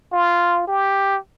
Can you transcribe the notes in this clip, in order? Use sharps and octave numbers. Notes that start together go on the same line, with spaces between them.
F4
G4